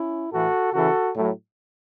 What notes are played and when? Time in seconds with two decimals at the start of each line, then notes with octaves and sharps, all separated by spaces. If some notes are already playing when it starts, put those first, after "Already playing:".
Already playing: C#4 E4
0.31 A2 E3 F#4 A4
0.73 C#3 E3 F#4 A4
1.15 A2 F#3